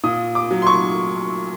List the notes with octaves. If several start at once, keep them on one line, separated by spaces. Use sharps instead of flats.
A#2 D#6
D6
F#3
C6
C#6